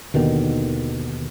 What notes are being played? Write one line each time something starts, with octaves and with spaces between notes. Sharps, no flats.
D#2 B2 D3 D#3